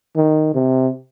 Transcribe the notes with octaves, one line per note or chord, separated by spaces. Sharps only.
D#3
C3